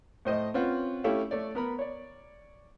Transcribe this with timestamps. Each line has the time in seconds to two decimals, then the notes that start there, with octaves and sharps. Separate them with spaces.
0.25 A2 C5 D#5
0.54 C4 C#4 F4 B4 F#5
1.04 A3 C#4 E4 G4 A4 F5
1.31 A3 C#5 D5
1.55 B3 A#4 B5
1.79 C#5 D5